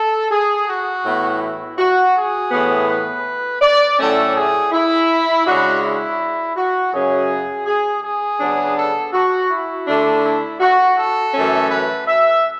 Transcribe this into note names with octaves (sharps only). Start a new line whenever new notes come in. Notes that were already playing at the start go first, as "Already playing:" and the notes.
Already playing: A4
G#4
F#4
A2 E3 B3
E4
F#4
G#4
A2 E3 B3
B4
D5
A2 F#3 A3 C#4 A4
G#4
E4
C#3 G#3 D4 F#4
E4
F#4
F#2 C#3 F#3 C#4 G#4
G#4
G#4
C#3 F#3 B3 D4
A4
F#4
E4
D3 A3 D4
E4
F#4
A4
F#2 E3 A3 C#4
B4
E5